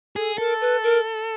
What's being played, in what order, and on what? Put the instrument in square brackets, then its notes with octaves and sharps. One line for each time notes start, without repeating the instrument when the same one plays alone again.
[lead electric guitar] G#4 [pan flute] A4
[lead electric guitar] A4 [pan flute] A#4
[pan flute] B4
A#4